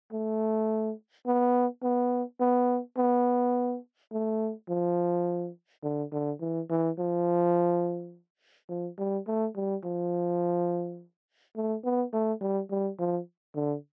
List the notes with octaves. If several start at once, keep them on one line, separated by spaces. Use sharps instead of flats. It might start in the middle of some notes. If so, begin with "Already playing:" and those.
A3
B3
B3
B3
B3
A3
F3
D3
D3
E3
E3
F3
F3
G3
A3
G3
F3
A3
B3
A3
G3
G3
F3
D3